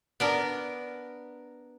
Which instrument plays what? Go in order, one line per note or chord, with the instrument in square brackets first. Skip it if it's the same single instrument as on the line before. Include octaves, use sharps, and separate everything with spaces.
[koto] B3 D4 A#4